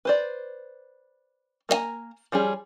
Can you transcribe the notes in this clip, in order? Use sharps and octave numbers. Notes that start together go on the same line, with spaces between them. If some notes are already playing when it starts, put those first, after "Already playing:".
B4 C5 D5
A#3 B3 D#5 G#5 A#5
F3 G3 C#4 G#4